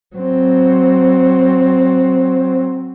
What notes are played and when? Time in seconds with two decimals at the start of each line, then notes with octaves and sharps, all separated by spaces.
0.16 F#3 C4